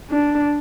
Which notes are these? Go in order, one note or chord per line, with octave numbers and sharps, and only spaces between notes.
D4